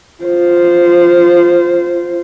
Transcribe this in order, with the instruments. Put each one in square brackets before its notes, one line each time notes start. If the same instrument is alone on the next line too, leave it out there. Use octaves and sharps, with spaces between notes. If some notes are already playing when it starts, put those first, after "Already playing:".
[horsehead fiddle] F4 C5